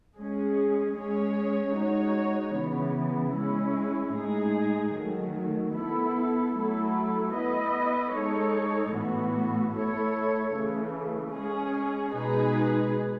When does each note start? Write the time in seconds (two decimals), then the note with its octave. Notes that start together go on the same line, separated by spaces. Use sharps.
0.16 G#3 C#4 G#4
0.95 G#3 C#4 G#4 C#5
1.76 G#3 D#4 F#4 C#5
2.55 C#3 E3 B3
3.35 G#3 C#4 E4
4.15 A2 G#3 D#4 G#4
4.95 D#3 F#3 A3
5.75 B3 E4 A4
6.54 F#3 A3 E4 A4
7.34 B3 E4 B4 D#5
8.14 G#3 D#4 A4 C#5
8.94 A2 E3 B3 F#4
9.74 A3 E4 A4 C#5
10.53 C#3 E3 A3
11.33 G#3 C#4 G#4
12.13 B2 G#3 D#4 G#4 B4